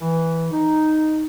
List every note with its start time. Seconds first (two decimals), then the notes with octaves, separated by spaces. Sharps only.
0.01 E3
0.52 D#4